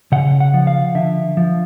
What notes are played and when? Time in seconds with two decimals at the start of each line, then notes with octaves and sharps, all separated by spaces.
0.12 C#3 F#5
0.40 F#5
0.54 F3
0.67 F5
0.95 D3 E5
1.37 F3